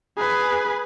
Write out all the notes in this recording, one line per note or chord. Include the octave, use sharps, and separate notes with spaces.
G#4 B4